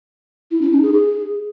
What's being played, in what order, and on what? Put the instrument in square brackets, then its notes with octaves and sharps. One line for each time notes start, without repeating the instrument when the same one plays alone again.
[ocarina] E4
C#4
D#4
G#4
G#4